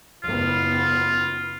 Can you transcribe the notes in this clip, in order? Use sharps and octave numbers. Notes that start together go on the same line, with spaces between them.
F#1 B3 F4